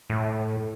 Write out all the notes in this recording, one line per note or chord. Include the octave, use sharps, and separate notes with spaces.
A2